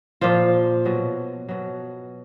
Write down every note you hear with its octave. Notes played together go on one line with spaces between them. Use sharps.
A#2 F3 F4
B2 F#3
B2 F#3